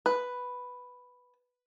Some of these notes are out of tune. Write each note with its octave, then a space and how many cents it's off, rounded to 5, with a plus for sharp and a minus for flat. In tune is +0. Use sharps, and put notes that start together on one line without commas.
B4 +0